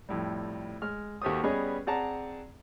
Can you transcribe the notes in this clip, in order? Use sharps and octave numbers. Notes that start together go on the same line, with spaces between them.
F2 A2 G3
G#3 F6
D#2 F#4 G4 A4 C5 D#6
G3 B3 C#4 G#4 B4 D#5
C4 G#4 D5 F#5 A5 A#5